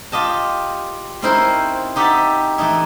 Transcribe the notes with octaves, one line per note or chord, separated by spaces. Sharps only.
F4 G4 D#5 A5
C4 C#4 D#4 E4 A#4 C5
D#4 G4 D#5 E5 F#5 A5
E3 A3 D#4 E4